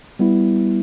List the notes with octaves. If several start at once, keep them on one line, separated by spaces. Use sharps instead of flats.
G3 B3 E4